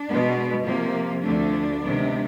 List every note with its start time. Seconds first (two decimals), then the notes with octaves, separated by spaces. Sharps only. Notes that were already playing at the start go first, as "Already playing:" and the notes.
Already playing: D4
0.08 B2 G#3 B3
0.65 C3 F3 A#3
1.23 D2 D3 F3 A3 D4
1.80 C3 D#3 G#3 B3